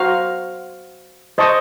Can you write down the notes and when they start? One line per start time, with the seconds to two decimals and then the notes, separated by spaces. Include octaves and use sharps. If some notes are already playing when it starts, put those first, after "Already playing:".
Already playing: F#4 C5 F5 A#5 C#6
1.38 C5 D#5 A5 C#6